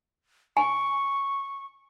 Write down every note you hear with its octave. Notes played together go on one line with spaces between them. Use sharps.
G#5 C#6